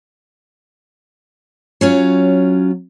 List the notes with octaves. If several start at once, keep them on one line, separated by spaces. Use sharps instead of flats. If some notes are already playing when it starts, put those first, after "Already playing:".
F#3 C#4 F4